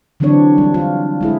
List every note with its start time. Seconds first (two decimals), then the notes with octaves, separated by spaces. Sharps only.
0.20 D3 E3 F#3 C4 D4 C#5
0.58 G3
0.74 F4
1.21 G#3 E4 G#4